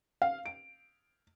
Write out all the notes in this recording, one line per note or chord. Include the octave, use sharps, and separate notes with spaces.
F5
D7